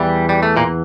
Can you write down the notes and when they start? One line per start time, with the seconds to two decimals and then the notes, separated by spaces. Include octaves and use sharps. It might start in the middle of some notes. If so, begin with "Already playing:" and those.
Already playing: E2 E3 G3
0.29 G3
0.43 A3
0.57 A#2 A#3